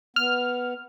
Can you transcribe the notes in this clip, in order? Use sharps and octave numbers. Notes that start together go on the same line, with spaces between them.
B3 F6